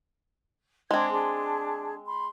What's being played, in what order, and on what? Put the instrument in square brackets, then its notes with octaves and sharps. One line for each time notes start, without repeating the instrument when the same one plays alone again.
[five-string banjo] G#3 C4 [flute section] D4 G#6
[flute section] D4 G#4 A5
B5 C6